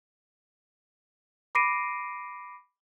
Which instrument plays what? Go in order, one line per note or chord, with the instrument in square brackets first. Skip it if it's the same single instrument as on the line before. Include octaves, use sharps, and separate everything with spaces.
[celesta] B5 D6 A#6 C7 D7 D#7